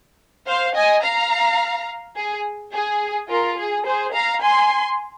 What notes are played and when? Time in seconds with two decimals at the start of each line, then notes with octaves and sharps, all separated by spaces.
0.47 C5 F5
0.75 D#5 G#5
1.04 F5 A#5
2.16 G#4
2.73 G#4
3.29 F4 A#4
3.57 G#4
3.85 G#4 C5
4.14 F5 A#5
4.41 G#5 C6